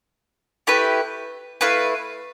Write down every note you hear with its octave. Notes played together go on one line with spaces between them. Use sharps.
A3 E4 G4 B4
A3 E4 B4 F5